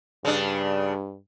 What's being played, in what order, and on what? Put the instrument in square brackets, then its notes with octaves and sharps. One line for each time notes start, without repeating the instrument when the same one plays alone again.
[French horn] G2 [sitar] C#3 D4